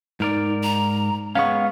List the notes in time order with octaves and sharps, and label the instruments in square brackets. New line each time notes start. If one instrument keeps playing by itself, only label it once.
[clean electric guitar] G#2 A#4 D5 [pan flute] D#4
[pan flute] A#5
[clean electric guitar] G#3 B3 C#4 [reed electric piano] F5 C#6 [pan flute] F#5